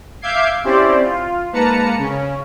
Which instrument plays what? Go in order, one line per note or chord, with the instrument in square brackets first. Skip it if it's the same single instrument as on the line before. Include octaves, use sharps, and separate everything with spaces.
[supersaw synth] E5 F5 D6 G6 G#6 C7
C4 C#4 E4 G4 C5 D5
F4
G#2 A#3 B4 A5 A#5 C#7
C#3 C#4